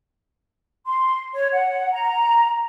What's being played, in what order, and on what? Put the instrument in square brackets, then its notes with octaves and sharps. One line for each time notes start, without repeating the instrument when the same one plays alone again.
[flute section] C6
C#5
F#5
A#5